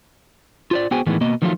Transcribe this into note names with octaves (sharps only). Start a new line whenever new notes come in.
F4 C5 D5
B3 F#4 G#4 C5 G5 G#5
A2 D#3 E3 G#3 B3
B2 A#3 D#5
D#3 F3 F#3 A3 E4 F4